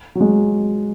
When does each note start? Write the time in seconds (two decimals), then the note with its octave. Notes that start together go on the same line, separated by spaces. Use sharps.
0.15 F#3
0.21 G#3